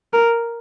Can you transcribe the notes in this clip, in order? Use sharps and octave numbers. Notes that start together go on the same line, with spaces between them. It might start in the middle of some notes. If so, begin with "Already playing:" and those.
A#4